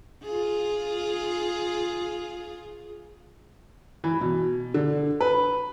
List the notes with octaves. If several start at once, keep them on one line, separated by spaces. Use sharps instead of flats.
F4 G#4
E3
B2
D3
B4